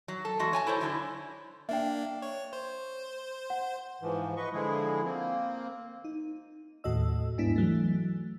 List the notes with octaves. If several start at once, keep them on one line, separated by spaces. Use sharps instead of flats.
F#3
A4
E2 G#3 F#4
C#5 G#5 A5
E4 A4 C5 C#5
D3 F#3 D#4 E4
A#3 D4 E5 G5
C#5
C5
F#5
G#2 E3 F3
B4 D#5 C#6
D3 F3 G#3 E4 G#4
A#3 C4
D#4
D#2 A2 F#4 A4 D#5 E6
G#2 B3 D4 E4 B6
E3 F#3 A3